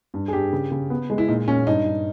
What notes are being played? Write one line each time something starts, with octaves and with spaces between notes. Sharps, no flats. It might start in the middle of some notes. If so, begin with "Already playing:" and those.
G2
G#4
G2 G4
C#3
C#3
B3
G#3
E4
A#2 D#4
A#2 C#4
G2 D#4
G2